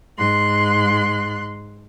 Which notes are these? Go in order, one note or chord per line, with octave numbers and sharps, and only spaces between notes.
G#2 C6 F#6